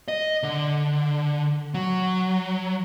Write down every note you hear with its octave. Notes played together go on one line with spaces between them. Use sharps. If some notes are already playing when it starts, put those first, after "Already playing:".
D#5
D3
F#3